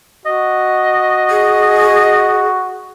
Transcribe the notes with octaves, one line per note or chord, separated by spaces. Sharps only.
F#4 D#5
G#4